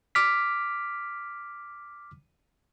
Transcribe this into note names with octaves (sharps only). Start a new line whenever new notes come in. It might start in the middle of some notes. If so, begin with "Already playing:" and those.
D6 F6 B6